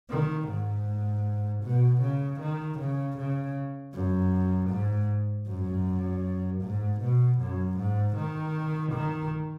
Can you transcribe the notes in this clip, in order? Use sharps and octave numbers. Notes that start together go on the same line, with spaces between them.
D#3
G#2
B2
C#3
D#3
C#3
C#3
F#2
G#2
F#2
G#2
B2
F#2
G#2
D#3
D#3